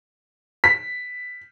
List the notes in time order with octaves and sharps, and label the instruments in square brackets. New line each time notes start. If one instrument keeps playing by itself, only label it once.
[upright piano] B6